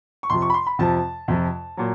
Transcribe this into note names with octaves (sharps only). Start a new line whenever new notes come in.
C#6
F2 C3 F3 C6
C#6
B5
C6
B5
F2 C3 F3 A5
F2 C3 F3
A#2 F#3